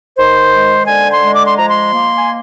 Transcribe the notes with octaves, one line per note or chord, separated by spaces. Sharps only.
D#3 C5
G#3
D3 G#5
C6
G#3
D6
C6
F3 A#5
C6
A#3
G#5